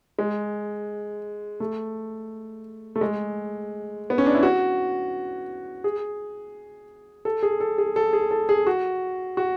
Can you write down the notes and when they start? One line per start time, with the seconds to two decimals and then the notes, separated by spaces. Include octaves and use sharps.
0.19 G#3
1.60 A3
2.96 A3
3.01 G#3
4.10 B3
4.18 C#4
4.26 D4
4.35 E4
4.43 F#4
5.84 G#4
7.25 A4
7.43 G#4
7.60 A4
7.78 G#4
7.96 A4
8.13 G#4
8.31 A4
8.49 G#4
8.67 F#4
9.37 F#4